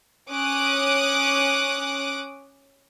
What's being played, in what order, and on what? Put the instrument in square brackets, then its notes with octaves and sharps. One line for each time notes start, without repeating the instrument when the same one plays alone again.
[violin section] C#4 D6 D#6 F#6